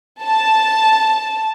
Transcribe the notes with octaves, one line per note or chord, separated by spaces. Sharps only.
A5